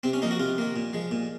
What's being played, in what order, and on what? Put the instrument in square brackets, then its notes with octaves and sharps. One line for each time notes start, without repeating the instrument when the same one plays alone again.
[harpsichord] C3 C4
C#4
F3 A#3 D#4
F#4
C3 F4
D#3 A#3
A#2
F3 G#3
A#2